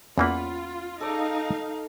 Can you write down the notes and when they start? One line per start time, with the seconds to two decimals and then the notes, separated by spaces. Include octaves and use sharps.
0.18 E2 E3 A#3 C#4 F4 F#5 B5
1.01 D#4 A4 D5 F5